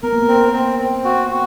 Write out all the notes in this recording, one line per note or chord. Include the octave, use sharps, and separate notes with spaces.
B3 A#4
A#3
B3
C4
C4
C4
F#4
F#4